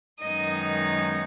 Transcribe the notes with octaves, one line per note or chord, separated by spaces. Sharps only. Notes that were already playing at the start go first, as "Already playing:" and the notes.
F#2 D#3 G#3 B3 D#4 D#5